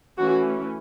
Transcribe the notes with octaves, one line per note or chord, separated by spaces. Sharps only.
E3 A3 C#4 F#4